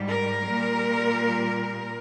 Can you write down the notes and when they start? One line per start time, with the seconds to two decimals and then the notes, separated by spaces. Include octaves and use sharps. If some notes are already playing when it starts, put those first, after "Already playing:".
Already playing: G#2 G3
0.09 A#4
0.46 A#2 G3